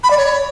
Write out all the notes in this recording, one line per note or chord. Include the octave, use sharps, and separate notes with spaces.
B5
D5
C#5